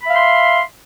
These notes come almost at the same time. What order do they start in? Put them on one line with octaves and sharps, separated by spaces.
B5 E5 F5 C6